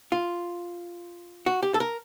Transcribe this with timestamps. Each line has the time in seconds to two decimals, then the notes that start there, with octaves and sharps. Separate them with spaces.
0.12 F4
1.46 F#4
1.63 G4
1.74 A4
1.80 A#4